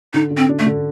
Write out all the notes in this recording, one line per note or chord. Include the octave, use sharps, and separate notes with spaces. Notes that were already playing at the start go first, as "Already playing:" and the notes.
D3 D#4
D3
C4
D4
A3
D3